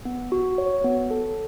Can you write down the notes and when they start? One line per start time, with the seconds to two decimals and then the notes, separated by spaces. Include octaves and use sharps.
0.05 B3
0.32 F#4
0.58 C#5
0.84 B3
1.11 A4